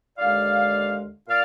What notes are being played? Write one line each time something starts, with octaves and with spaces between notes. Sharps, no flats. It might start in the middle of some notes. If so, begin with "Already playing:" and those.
D#2 D3 G#3 D5 F5
A#2 D5 F5